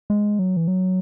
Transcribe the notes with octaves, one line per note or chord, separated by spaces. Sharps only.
G#3
F#3
E3
F#3